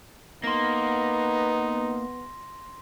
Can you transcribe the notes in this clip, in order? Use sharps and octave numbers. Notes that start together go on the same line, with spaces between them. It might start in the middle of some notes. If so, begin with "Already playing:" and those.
A#3 B3 D#4 C6 A#6